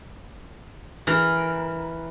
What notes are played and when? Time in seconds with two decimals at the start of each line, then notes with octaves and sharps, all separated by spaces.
1.07 E3 A#4